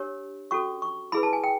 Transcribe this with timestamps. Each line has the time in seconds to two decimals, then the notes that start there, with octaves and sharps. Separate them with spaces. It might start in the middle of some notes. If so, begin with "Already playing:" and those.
Already playing: D4 G4 A#4 C#5
0.51 C#4 F#4 A4 C#6
0.82 C#6
1.12 E4 G#4 B4 B5
1.23 A5
1.33 G#5
1.44 G5